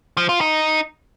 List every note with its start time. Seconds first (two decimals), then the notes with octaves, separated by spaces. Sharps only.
0.17 F3
0.29 F4
0.41 D#4